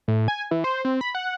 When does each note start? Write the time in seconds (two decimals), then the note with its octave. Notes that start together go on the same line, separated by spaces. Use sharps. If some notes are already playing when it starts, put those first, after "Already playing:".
0.08 A2
0.28 G#5
0.51 E3
0.64 C5
0.85 C4
1.01 B5
1.15 F#5